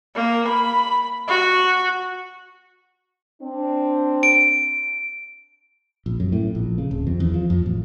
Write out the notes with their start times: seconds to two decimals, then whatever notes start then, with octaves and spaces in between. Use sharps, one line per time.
0.16 A#3
0.48 B5
1.28 F#4
3.42 C4 D4
4.23 D7
6.06 A#1
6.20 F#2
6.32 A2
6.55 A#1
6.78 C#3
6.91 D1
7.07 F2
7.20 E2
7.34 F3
7.50 F2
7.66 A1